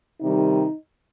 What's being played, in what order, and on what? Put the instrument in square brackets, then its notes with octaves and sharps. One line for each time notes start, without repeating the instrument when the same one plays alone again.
[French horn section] C3 D#3 G3 D#4